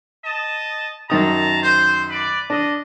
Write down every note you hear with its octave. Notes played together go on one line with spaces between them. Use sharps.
D#5 A5
F#2 D#3 A5 A#5 D#6
C5
B4 D5
D4 D#5